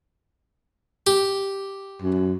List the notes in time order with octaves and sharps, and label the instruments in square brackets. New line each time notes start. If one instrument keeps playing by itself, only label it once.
[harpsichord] G4
[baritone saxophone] F#2